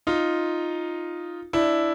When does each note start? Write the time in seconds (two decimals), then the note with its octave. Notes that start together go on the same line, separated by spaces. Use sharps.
0.07 D#4 F4
1.53 D4 E4